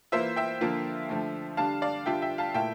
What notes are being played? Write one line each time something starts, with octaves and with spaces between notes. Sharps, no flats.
E3 A#3 F4 C5 E5
E5 G5
D3 F3 A#3 F4
D3 F3 A3
D3 G3 D4 F5 A5
D5 F5
D3 G3 D4 F4 E5 G5
E5 G5
F5 A5
A#2 A3 E4 E5 G5